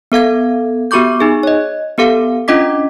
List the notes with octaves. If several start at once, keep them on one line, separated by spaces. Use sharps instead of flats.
B3 A4 F5 G#6
B3 F#4 G4 C#6 D6 G6
D#4 G#4
C#5 D#5
B3 G4 A4 F5
C#4 D4 F4 D#5 D6 B6